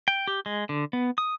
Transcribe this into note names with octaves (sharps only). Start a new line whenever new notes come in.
G5
G4
G#3
D3
B3
D#6